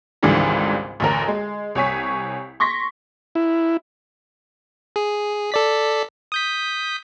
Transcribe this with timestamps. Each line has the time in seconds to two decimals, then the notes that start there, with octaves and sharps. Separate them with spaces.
0.23 G#1 C#2 G#2 D3 E3 G3
1.00 A1 D2 A#4
1.28 G#3
1.75 C2 C#5 G#5 B6
2.60 C6 C#6 A#6 B6
3.35 E4
4.96 G#4
5.52 A4 D5 B6
6.32 D#6 G6 B6